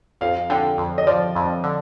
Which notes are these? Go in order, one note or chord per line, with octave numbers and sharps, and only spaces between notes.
F2 F5
D3 G5
F2
D#5
F3 D5
F2
D3